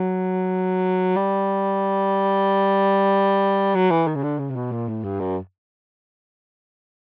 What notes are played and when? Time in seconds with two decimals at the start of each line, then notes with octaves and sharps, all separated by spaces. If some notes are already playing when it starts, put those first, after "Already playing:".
Already playing: F#3
1.16 G3
3.75 F#3
3.91 E3
4.07 D#3
4.16 C#3
4.24 D3
4.39 C#3
4.50 C3
4.56 B2
4.72 A#2
4.89 A2
5.04 G2
5.20 F#2